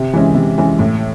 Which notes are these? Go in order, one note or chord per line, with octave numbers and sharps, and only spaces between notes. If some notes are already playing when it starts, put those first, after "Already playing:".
Already playing: C3
E3 G#3 C#4
C3
E3 G#3 C#4
A2